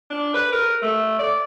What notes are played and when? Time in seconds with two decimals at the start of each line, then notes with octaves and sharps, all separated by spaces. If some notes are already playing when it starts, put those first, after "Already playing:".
0.10 D4
0.34 B4
0.52 A#4
0.82 A3
1.19 D5